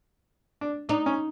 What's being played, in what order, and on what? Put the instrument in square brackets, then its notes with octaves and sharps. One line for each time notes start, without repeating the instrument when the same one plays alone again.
[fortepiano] D4
[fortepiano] D4 [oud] D#4
[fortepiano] C#4